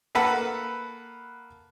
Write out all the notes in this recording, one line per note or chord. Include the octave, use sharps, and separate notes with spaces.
A#3 A4 B4 F#5